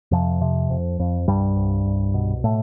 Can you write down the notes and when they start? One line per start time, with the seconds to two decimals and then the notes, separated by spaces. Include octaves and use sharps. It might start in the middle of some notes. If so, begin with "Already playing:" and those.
0.11 F2 C3 F3
0.41 C3
0.70 F2
1.00 F2
1.28 C2 G2 G3
1.56 C2
1.85 C2
2.14 B2
2.44 A2 A3